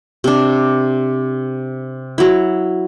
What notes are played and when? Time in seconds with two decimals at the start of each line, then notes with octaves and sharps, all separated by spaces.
0.24 C3 D4
2.18 F#3 E4